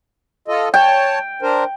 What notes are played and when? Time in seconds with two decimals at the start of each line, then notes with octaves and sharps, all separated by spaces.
0.48 F4 A4 D#5
0.74 C#5 G5 A5
1.42 D4 A#4 C5